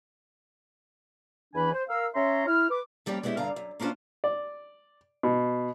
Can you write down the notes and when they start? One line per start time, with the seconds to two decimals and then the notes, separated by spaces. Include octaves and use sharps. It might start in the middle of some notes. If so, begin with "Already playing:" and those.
1.54 E2 E3 D4 B4 G#5 B5
1.72 C5
1.89 A#4 F5 E6
2.15 C#4 C#5 E5 A#5 C6
2.47 E4 F6
2.70 B4 D6
3.06 F2 G3 A#3 C#4 G4
3.23 G#3 B3 C#4 E4 G4
3.37 G2 D3 F5 A#5
3.56 F#2
3.80 A#3 C#4 D4 F4 C5
4.24 D5
5.23 B2